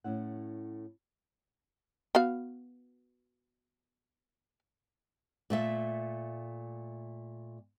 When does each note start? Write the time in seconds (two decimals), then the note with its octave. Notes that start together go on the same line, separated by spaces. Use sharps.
0.04 A2 C#4 E4 F#5
2.15 B3 F#4 F5
5.50 A#2 A3 E5